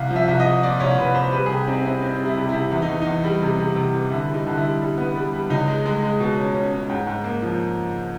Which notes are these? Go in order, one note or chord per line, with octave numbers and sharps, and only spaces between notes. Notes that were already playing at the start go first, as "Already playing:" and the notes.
Already playing: C2 F5
F3
E5
C2
D#5
C2
A#2 D5
C2 C#5
C2 B4
C2 C5
G3 B4
G#4
C3 G4
C4 D#4
C4 E4
C4 D#4
G3
E4
C3
E4
C3
E2 E4
D#4
E2
E2 D#4
G3
C3
C3
C3
E3
D3 E4
G3
D#4
D3
E4
G3
G3
B3
G3
G3
C#2 D#4
G#3
G#3
G#3
B2
C#4
C#4
C#4
G#2
G#2
A#3
F3